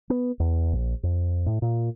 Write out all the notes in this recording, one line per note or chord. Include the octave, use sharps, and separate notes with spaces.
B3
E2
A#1
F2
A2
A#2